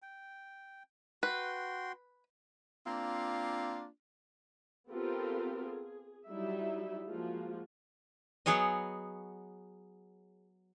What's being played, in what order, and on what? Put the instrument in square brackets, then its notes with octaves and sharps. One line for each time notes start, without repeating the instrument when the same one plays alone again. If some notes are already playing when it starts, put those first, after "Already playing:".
[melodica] G5
[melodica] F#4 G5 C6 [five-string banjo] B4
[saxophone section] A#3 C4 D4 F4
[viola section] B3 C4 F4 G4 A4 A#4
G#4
F#3 G3 D#4 E4 E5
F3 G#3 A#3 F4 F#4
[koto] F#3 B3 G#4 C#5 D#5